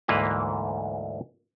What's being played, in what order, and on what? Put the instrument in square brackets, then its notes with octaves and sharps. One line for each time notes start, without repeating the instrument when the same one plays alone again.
[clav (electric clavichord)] D2 G#2 E3 A#3 B4